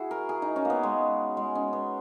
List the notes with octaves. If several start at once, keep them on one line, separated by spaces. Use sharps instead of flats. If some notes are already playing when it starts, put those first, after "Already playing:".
Already playing: E4 F#4 G#4
A#4
G#4
D#4
C#4
A#3
B3
G#3
G#3
C#4
B3